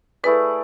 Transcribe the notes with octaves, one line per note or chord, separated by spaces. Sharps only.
A3 E4 G#4 B4 D5